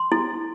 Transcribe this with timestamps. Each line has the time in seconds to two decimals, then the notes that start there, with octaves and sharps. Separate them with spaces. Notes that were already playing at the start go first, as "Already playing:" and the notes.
Already playing: C6
0.12 E4